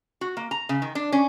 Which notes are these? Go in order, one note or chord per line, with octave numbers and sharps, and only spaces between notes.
F#4
A#3
A#5
C#3
D#3
D4
C#4